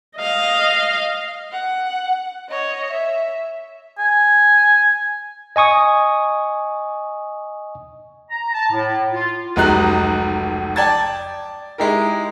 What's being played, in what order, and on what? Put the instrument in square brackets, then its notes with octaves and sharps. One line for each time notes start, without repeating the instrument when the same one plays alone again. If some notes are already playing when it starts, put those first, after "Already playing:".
[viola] D#5 F5
[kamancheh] F#5
C#5 D#5
E5
[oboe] G#5
[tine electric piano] D#5 G#5 C#6 D#6
[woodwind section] A#5
A5
A2
F4
[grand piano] F1 C#2 F#3 G#3 D#4 F#6
D5 G5 A5 G#6 A6
G#3 D#4 E4 G4 A#4